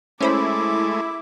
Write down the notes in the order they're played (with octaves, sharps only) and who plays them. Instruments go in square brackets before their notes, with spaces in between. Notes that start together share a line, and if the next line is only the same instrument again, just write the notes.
[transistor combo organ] G#3 A3 [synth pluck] C#4 C5 B5 [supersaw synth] E4 [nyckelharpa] D6